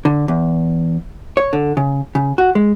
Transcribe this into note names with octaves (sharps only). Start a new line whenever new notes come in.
D3
E2
C#5
D3
C#3
C#3
F#4
G#3